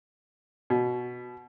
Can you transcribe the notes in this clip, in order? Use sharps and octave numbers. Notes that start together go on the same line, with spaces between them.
B2